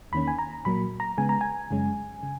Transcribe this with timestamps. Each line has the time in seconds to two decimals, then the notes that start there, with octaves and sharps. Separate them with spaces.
0.12 E2 D#3 A#3 C#4 B5
0.28 G#5
0.39 A#5
0.65 A#2 F#3 A#3 B5
1.00 A#5
1.18 C#3 G#3 B3 G#5
1.29 A#5
1.41 G#5
1.71 F#2 C#3 G#3 C#4
2.23 C#3